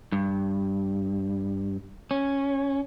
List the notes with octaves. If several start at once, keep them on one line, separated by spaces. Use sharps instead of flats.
G2
C#4